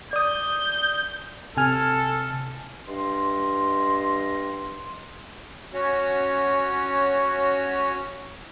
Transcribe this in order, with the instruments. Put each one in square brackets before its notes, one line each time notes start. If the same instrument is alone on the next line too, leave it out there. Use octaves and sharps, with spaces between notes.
[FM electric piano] D5 D#6 [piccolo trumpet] G6
[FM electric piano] C3 G#5 F6 [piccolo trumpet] A4
[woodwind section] G2 D#5 C6
[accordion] C#4 F#4 C#5